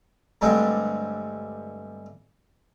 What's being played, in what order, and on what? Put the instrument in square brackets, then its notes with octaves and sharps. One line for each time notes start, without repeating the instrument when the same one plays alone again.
[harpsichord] G2 D3 G#3 A3 C4